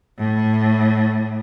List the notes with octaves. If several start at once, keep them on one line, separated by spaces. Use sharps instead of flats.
A2